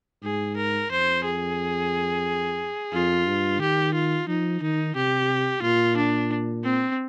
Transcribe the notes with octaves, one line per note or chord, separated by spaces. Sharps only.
G#2 G#4
A#4
F2 C5
G#4
F2 F4
G2
D#3 G4
F4
F3 D#4
D#3 D#4
C3 G4
A#2 F4
D4
C4